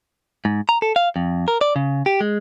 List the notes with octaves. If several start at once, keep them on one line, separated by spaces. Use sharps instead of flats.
G#2
A#5
A4
F5
F2
A#4
D5
C#3
G4
G#3